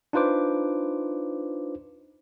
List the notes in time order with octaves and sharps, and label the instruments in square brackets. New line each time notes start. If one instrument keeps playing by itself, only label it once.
[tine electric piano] D4 D#4 F4 B4 C5 D6